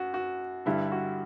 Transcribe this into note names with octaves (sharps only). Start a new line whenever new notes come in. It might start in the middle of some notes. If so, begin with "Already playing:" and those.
Already playing: F#2 F#4
F#4
G2 D3 G3 E4
F#4